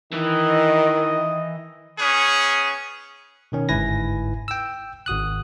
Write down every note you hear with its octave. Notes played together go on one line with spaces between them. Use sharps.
D#3 E3 D#5
B3 C#4 G#4
B2 D#3 C#4
G1 G#2 E4 B4 G#5 A#6
G5 E6
G#1 F#4 D#6 F#6